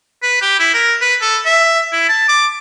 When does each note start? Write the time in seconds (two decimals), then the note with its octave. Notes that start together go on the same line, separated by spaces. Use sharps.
0.23 B4
0.42 G4
0.59 E4
0.74 A#4
1.01 B4
1.21 A4
1.45 E5
1.92 E4
2.09 A5
2.28 D6